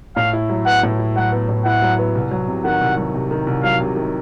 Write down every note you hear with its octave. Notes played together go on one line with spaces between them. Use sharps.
A2 F5
E4
F#3
B3 F#5
A2
E4
F#3 F#5
B3
A2
E4 F#5
F#3
B3
C2
F#3
C3
D#3 F#5
C2
F#3
C3
D#3
C2
F#3 F5
C3
D#3